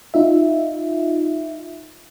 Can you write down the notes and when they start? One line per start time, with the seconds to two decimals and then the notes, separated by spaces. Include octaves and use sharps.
0.14 D#4 F4 E5